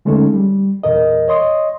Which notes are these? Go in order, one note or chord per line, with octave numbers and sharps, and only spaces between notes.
D3 G#3 A3 C#4 D#4 A4
G3
E2 A#2 A#4 D#5
C#5 D#5 C6 D#6